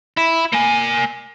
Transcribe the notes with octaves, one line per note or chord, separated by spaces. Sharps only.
E4
A#3 G#5